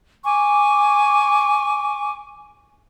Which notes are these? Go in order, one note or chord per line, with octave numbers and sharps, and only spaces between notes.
G#5 C#6 D6